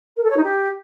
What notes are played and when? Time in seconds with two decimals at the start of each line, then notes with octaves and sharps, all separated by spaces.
0.17 A#4
0.23 A4
0.30 C#5
0.37 D#4
0.43 G4